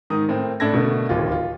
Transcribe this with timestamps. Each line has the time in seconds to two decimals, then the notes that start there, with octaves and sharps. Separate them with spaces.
0.10 G#2 D#3 A#5 D#6
0.29 A2 C4 A#4
0.60 A2 D4 E4 A4 G#6 A#6
0.74 B2 D3 A3 A#3
1.09 D1 D#2 F3 F4
1.32 F4